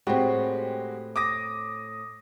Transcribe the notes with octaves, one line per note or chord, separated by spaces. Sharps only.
A2 G#3 C4 F#4 G4
D6 D#6 A#6